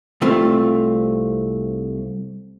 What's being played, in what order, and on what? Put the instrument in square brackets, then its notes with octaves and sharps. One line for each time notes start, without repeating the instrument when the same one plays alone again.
[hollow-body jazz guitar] C2 A3 C4 F4